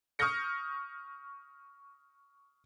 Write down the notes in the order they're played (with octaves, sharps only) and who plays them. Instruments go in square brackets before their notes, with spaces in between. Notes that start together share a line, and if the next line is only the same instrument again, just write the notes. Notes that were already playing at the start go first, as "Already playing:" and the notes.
[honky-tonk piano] C#6 D#6 F6 G6 A#6 C#7